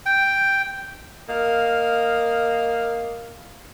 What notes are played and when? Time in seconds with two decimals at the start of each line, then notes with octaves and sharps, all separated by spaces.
0.06 G5
1.28 A#3 D#5 F5